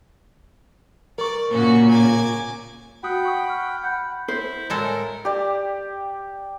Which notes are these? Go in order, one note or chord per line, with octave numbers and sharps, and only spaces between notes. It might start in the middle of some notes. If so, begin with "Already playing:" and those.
A#4 D5 C#6
A#2 C#3 A#3 C#4 F#4
G#5 D6
F#4 F#5 G5 B5 D#6
C#6 D#6
F6
F#5 B5 G6
E4 C5
A2 G#3 A4 A#4
G4 D5